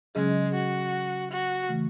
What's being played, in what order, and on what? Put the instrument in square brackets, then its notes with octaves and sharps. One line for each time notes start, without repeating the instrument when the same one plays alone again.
[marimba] C#3 F#3 C#4 G#4 D#5 [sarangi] G#3
[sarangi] F#4
F#4
[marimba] C#3 E3 A3